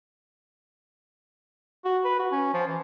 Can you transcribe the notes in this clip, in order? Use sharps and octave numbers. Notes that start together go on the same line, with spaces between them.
F#4
B4
F#4
C#4
F3
E3